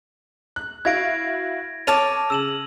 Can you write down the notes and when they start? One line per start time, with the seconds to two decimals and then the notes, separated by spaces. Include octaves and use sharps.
0.56 F#6
0.85 E4 F#4 F5 G#6 A#6 D7
1.87 A4 C#5 A5 D6 F6 D#7 F7
2.30 C#3 E6 E7 F#7